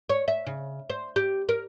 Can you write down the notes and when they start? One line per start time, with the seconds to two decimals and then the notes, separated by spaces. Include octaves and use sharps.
0.09 C#5
0.28 E5
0.46 C#3
0.90 C5
1.16 G4
1.49 A#4